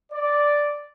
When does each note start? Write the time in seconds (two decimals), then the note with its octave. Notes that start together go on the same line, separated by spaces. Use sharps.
0.12 D5